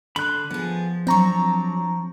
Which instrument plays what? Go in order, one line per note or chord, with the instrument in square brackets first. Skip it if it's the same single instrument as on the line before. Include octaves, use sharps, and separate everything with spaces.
[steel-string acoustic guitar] D3 [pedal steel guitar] B5 C6 F#6
[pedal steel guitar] F3 [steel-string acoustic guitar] B3 G#4
[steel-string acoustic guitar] F#3 D4 [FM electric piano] C4 A#5 C#6